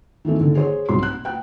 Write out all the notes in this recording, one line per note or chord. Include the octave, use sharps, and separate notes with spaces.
D#3 E3 A3 C4
D3 D#3
G#4 C5 C#5
B1 G3 C4 C6
F#6
G5 F#6